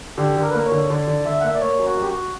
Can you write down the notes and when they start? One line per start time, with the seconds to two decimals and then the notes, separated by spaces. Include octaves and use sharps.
0.18 D3 G4
0.36 D3 A#4
0.49 B4
0.54 A#3 A#4
0.65 C#5
0.72 D3
0.89 D3 D5
1.08 D3
1.25 D3 E5
1.40 F#5
1.43 A#3 E5
1.55 D5
1.61 A#3 C#5
1.79 F#2
1.85 F#4
1.97 F#2 G4
2.09 F#4